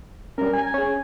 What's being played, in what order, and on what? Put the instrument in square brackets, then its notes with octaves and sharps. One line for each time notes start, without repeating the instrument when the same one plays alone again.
[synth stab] G3 C#4 [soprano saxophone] A#4
[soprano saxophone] G#5
[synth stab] C#4 G#4